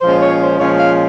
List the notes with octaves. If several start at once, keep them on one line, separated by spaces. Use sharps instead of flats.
A#2 F3 G#3 C#4 F4 C5
C#5
C5
A#2 F3 G#3 C#4 F4 C#5
F5